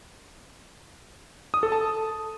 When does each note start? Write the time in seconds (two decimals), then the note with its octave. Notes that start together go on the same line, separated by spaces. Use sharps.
1.54 D#6
1.63 A4
1.72 A5